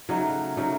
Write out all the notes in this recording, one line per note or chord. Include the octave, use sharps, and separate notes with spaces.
C#3 F#3 A3 D#4
C#3 F#3 A3 D#4